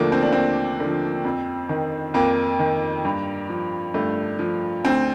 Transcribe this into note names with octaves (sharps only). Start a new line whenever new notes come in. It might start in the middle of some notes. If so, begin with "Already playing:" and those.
Already playing: D#2 D3 F3 A3 A#3
C4
D4
D#2 C4
D3 F3
F2
D#3
F2 A#3
D#3
G2
F3
G2 A3
F3
D2 C4